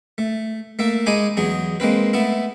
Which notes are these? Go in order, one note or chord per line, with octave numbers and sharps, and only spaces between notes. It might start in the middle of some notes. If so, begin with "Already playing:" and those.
A3
A3 A#3 E5
G#3 D#4 G#5 B5 D6
E2 F#3 G#4
G#3 A#3 C4 B4
A3 B3 E4